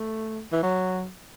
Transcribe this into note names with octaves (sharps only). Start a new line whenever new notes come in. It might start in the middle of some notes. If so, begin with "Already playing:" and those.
Already playing: A3
E3
F#3